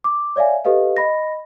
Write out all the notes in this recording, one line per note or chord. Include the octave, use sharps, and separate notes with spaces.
D6
C#5 D5 E5 F5 G#5
G4 A4 B4 D#5 F5
D#5 B5 A#6